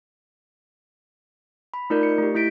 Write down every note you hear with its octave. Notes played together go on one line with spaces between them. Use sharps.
B5
A3 D#4 F4 A#4 D5 G6
C#7
A3 G4
A3 E4 G6 B6 D7